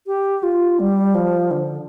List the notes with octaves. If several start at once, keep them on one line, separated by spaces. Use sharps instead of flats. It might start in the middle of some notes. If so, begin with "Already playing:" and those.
G4
F4
G3
F3
D3